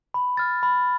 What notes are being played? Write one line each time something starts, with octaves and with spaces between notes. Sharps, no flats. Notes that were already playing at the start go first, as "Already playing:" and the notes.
B5
F6 A6
B5